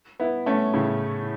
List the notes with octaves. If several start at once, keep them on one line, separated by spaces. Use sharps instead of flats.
B3 E4
A3 C#4
A2 C#3